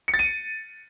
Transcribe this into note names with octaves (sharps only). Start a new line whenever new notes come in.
C#7
A6
D#7